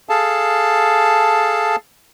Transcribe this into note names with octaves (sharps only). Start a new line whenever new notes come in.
G#4 A4 F5 A5